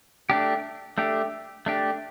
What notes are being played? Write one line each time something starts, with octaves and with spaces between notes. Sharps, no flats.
A3 D4 G4
A3 D4 G4
A3 D4 G4